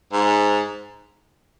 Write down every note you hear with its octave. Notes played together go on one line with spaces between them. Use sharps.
G#2